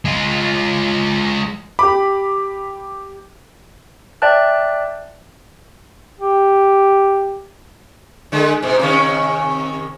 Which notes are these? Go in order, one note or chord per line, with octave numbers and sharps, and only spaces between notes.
G#3 F4
G4 B5 D6
D5 E5 G5 A5 F#6
G4
D3 G#3
G#2 B2
C3 D#3 C#4